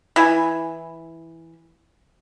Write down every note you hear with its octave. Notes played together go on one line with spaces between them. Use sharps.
E3 E4 G#5